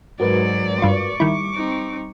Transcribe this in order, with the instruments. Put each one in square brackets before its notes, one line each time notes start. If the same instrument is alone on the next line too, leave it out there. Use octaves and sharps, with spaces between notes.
[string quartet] G#2 F#3 [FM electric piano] F#4 A#4 B4 [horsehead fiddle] D5
[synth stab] G2 F4 [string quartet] C#6 D6
[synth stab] D#3 E4 [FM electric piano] G3
[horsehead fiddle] C4 D#4